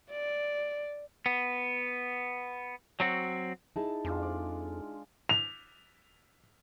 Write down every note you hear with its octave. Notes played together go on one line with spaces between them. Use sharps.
D5
B3
F#3 C4 F#4
D#4 E4 G#4 A5
F2 G#3 D4 F4
D5
F7